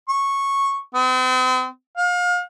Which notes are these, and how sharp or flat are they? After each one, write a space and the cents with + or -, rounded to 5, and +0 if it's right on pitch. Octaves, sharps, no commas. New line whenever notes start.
C#6 -10
C4 -40
F5 +35